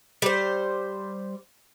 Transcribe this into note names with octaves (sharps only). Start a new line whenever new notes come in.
G3 C5